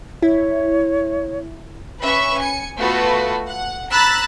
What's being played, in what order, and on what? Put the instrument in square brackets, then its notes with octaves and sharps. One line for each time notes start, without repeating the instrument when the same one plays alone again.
[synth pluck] E4 [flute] C#5
[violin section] C#4 B4 E5 C#6
G#5 C#7
A3 B3 F4 F#4 A4 B4
F#5
A#5 B5 E6 F#6 A6